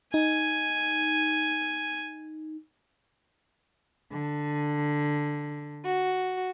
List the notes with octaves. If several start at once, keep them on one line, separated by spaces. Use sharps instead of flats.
D#4 G#5
D3
F#4